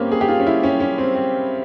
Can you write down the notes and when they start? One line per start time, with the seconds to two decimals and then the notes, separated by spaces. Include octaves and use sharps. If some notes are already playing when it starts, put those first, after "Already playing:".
Already playing: G2 A#3 C4 C#4 G4
0.12 G#4
0.21 G4
0.28 F4
0.40 C#4
0.47 E4
0.63 C#4
0.80 C#4
0.98 C4
1.15 C4